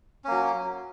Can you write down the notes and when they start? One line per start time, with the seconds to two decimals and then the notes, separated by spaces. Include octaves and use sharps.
0.24 C#4
0.28 A#3
0.31 F#3